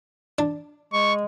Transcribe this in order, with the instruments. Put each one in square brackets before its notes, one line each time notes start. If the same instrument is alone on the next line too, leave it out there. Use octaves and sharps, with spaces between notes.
[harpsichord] D4
[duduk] G#3 [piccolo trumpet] C#6